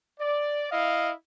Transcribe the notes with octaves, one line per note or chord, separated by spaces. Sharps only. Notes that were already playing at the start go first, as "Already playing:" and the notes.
D5
E4 D#5 F5